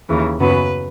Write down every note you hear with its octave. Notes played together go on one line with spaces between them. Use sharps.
D#2 C#3 E3
F#2 C#3 F#3 B3 B4